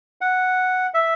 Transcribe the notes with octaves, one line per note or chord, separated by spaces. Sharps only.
F#5
E5